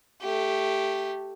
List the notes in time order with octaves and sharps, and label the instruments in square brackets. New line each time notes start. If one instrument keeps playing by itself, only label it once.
[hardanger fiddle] A3 G4